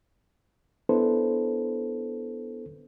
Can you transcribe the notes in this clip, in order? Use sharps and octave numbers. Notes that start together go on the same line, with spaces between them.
B3 D4 E4 A4 B4 C5